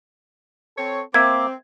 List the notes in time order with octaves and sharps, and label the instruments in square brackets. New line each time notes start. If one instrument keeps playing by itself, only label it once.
[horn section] C4 A4 C#5
[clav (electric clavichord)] A#3 E5 [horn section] C4 [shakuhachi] D6 [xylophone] G#6